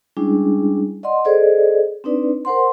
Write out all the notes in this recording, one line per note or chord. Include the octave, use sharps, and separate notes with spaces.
G3 G#3 C#4 D4 E4 G#4
D5 D#5 F#5 C6
G#4 A4 C5 D5 D#5
C4 D4 D#4 B4 D5
A#4 C5 F#5 C6